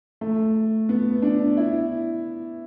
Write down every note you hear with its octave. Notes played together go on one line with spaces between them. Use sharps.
A3
B3
D4
E4